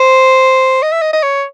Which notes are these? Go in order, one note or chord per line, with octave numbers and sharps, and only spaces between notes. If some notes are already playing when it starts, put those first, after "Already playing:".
Already playing: C5
D#5
E5
D#5
D#5
C#5